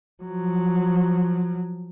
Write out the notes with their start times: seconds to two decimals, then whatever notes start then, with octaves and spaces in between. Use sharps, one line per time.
0.24 F3 F#3